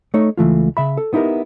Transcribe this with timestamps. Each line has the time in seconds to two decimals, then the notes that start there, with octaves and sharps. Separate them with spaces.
0.14 A3 D#4 C#5
0.37 C#2 E3 A3 F4
0.77 C#3 E5 B5
0.97 A4
1.13 B3 D#4 E4 G4 A#4